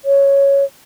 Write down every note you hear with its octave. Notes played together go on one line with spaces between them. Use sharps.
C#5